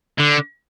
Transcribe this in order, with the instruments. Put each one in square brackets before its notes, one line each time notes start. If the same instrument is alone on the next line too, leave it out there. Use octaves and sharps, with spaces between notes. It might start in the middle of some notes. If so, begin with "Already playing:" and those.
[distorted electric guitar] D3